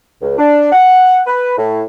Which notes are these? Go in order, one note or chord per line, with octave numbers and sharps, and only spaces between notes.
C#2
D4
F#5
B4
A2